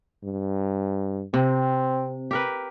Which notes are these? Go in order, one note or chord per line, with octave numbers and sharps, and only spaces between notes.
G2
C3 C4
G4 A#4 B4